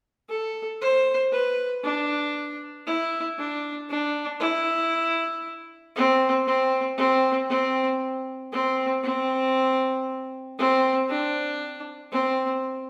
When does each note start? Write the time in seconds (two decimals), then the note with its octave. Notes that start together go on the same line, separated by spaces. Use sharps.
0.29 A4
0.81 C5
1.32 B4
1.84 D4
2.87 E4
3.38 D4
3.90 D4
4.41 E4
5.95 C4
6.47 C4
6.98 C4
7.49 C4
8.52 C4
9.03 C4
10.58 C4
11.09 D4
12.12 C4